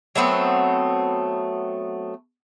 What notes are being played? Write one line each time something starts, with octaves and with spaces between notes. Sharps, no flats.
F#3 A3 B3 C4